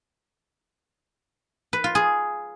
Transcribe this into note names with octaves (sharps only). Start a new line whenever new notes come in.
B4
F4
G#4